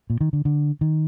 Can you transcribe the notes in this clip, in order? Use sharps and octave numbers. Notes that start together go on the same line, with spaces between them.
A#2
D#3
D3
D3
D#3